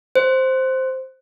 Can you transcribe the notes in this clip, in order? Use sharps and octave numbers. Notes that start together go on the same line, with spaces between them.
C5